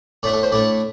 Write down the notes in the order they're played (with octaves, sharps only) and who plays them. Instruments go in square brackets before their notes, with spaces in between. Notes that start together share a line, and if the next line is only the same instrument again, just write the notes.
[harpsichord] A2 A3 D4 D5
A4
C5
A2 A3 D4 D5